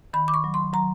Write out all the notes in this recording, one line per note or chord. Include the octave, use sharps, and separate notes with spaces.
D#3 B5
D6
C#6
F#3
C6
F#3 A#5